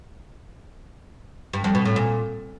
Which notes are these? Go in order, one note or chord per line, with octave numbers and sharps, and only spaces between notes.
G2
F2
B2
A2
A#2